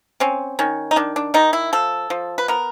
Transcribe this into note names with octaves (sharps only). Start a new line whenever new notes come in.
C4 C#4
D#3 C#4
D#4
D#3 D4
D4
D#3 D#4
E4
F3 A4
F3
B4
B3 A#4